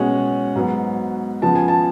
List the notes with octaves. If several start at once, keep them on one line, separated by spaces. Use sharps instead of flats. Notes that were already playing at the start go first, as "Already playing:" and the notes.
Already playing: B2 G#3 C#4 F#5
G#2 F#3 B3
C#3 F3 B3 A5
G#5
A5